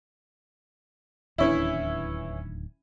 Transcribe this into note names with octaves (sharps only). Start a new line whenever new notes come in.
D1 D#2 E3 C#4 D4 E4